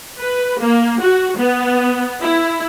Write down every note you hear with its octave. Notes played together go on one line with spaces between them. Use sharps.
B4
A#3
F#4
B3
E4